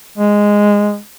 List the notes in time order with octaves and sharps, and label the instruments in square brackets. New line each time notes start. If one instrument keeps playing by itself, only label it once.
[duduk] G#3